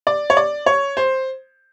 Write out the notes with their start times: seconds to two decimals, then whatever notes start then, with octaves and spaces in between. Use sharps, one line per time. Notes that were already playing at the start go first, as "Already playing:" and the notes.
0.07 D5
0.30 C#5
0.37 D5
0.66 C#5
0.97 C5